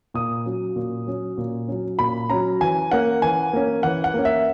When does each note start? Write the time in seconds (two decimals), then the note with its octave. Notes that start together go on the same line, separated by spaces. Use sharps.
0.14 A#2 D#6
0.46 F#3 C#4
0.76 A#2
1.07 F#3 C#4
1.38 A#2
1.68 F#3 C#4
1.99 A#2 B5
2.29 F#3 C#4 A#5
2.61 E3 G#5
2.91 A#3 C#4 F#5
3.22 E3 G#5
3.53 A#3 C#4
3.83 E3 F#5
4.04 F#5
4.14 A#3 C#4
4.25 E5